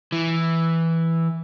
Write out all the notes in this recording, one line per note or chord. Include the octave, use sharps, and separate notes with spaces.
E3